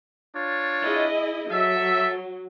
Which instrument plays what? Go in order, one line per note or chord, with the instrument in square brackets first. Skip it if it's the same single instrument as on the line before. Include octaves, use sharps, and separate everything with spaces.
[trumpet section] D4 F4 C#5
[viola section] E4 G#4 D#5
[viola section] F#3 [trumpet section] A4 E5